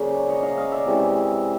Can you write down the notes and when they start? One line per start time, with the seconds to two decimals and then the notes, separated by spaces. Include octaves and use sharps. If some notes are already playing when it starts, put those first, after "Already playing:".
Already playing: C#3 F#3 A#3 C#4 C5 D5
0.28 C#5 D#5
0.43 D#5 F5
0.57 D#5 F5
0.72 D5 E5
0.86 C3 E3 G#3 C#4